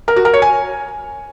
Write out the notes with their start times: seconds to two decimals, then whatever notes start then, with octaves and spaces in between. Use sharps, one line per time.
0.08 A#4
0.16 F#4
0.25 A#4
0.34 C#5
0.42 G#5